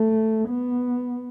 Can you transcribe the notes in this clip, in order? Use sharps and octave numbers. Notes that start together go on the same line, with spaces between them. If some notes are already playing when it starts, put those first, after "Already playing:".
Already playing: A3
B3